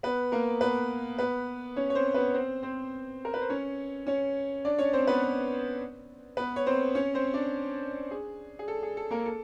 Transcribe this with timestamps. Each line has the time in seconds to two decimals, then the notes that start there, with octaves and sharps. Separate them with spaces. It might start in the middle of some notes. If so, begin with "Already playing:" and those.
0.03 B3 B4
0.32 A#3 A#4
0.61 B3 B4
1.19 B3 B4
1.76 C#4 C#5
1.90 C#5
1.95 C4 C5
2.14 B3 B4
2.34 C4 C5
2.63 C4 C5
3.25 A#4
3.34 B4
3.41 C5
3.49 C#4 C#5
4.07 C#4 C#5
4.65 D4 D5
4.79 C#4 C#5
4.93 C4 C5
5.07 B3 B4
6.37 B3 B4
6.56 C#5
6.66 C4 C5
6.95 C#4 C#5
7.14 C4 C5
7.34 D4 D5
8.11 G#4
8.59 G#4
8.68 A4
8.83 G#4
8.97 A4
9.11 A#3 A#4
9.26 A4